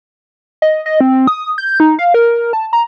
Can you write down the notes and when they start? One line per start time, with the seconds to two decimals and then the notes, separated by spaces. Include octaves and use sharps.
0.62 D#5
0.86 D#5
1.01 C4
1.27 D#6
1.58 G6
1.80 D#4
1.99 F5
2.14 A#4
2.53 A5
2.73 A#5